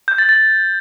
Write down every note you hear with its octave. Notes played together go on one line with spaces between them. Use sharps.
G6
A6
A6